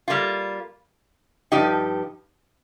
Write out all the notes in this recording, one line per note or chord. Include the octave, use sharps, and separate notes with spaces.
G3 A#3 F4
G2 F3 D#4 G4